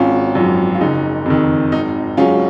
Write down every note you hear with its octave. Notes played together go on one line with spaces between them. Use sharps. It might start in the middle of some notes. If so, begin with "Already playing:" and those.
Already playing: G#1 C#4 F4
F#2 F3
F4
F#1 D#4
F2 D#3
G#1 D#4
G#2 F#3 C#4 F4